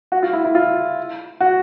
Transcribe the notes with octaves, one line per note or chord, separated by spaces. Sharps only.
F#4
F4
E4
E4
F4
F#4